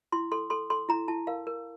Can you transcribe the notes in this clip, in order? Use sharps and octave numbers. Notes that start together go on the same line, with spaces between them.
E4 C6
A4 C6
A4 C6
A4 C6
E4 A#5
E4 A5
A#4 F5
A#4